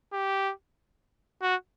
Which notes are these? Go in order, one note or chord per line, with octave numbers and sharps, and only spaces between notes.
G4
F#4